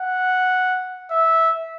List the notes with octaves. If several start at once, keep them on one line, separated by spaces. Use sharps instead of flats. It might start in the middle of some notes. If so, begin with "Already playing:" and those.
Already playing: F#5
E5